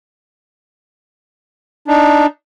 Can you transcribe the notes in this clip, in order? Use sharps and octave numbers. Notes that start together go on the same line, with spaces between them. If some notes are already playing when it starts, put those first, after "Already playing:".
D4 D#4